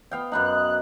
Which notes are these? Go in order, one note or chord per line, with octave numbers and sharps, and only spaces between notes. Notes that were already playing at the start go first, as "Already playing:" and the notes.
B3 F5 G5
F#2 B3 D#4 F#6